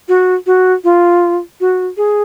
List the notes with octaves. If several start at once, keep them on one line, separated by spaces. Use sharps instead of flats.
F#4
F#4
F4
F#4
G#4